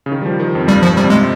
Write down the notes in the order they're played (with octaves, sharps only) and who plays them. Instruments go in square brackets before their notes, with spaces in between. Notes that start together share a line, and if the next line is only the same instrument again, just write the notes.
[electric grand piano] C#3
D#3
G3
F3
D#3
F2
[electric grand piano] G2 [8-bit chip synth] G3
[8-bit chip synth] F3
[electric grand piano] C3 [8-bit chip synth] G3
[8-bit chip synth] G#3